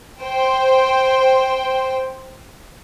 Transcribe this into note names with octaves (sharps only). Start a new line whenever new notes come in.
C5 G5